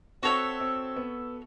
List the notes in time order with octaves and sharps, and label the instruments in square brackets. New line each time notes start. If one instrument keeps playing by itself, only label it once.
[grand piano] C4 [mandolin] F#4 A4 C#5 E5
[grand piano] C4
B3